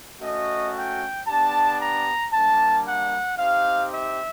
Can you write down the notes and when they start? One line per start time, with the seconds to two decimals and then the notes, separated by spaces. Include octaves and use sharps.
0.22 A3 C#4 F#4 D#5
0.75 G5
1.27 B3 D4 G4 A5
1.80 A#5
2.32 G3 A#3 D4 A5
2.86 F#5
3.38 C4 D#4 G4 F5
3.92 E5